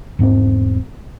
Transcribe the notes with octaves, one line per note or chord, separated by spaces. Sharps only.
E1 G#2 A#3 C4